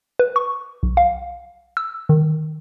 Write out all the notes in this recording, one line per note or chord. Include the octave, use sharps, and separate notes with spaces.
B4
C#6
B1
F5
E6
D#3